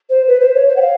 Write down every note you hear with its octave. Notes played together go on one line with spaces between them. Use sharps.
C5
B4
C5
C#5
C5
F#5
F5